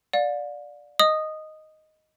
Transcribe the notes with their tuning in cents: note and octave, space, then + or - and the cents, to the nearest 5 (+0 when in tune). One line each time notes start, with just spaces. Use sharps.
D5 +0 F5 +40
D#5 +0 D#6 -10